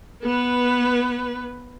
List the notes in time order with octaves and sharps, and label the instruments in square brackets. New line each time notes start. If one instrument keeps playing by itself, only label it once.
[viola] B3 B4